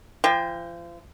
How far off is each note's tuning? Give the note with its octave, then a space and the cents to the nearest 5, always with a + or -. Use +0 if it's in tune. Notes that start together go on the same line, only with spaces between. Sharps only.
F3 -35 G5 +25